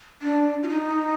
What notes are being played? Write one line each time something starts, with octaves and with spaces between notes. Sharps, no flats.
D4
F4
D#4